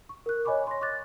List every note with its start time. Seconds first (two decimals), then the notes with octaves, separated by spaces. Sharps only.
0.09 C#6
0.26 A#4 F#6
0.45 C#5 D#5 G#5 B5 C#6 D6
0.67 C6 A#6
0.81 C#6 D6 F#6 A6